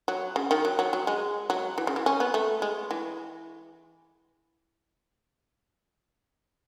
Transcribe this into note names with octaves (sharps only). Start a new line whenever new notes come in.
F#3
C#3
D#3
F#3
F#3
F#3
G#3
F#3
E3
C#3
E3
C#4
B3
A3
G#3
E3